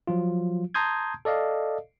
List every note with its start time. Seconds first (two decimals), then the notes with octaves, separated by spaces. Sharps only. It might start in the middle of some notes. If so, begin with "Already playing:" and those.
0.07 F3 F#3 F4
0.74 A5 A#5 C6 D#6 G6 G#6
1.25 A4 D5 D#5 F5